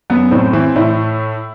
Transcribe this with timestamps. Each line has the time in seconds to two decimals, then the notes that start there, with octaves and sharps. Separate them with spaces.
0.10 F#2 B3
0.31 A2 C4
0.53 E3 C4
0.76 A2 E4